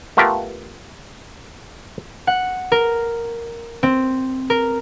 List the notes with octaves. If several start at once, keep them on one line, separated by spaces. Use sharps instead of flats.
A3 B3 F4 G4 A#4
F#5
A#4
C4
A#4